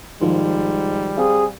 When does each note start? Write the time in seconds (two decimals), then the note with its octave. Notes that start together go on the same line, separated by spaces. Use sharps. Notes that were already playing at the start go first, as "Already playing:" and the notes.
0.21 G#2 D#3 F3 G3
1.17 C4 G#4 F5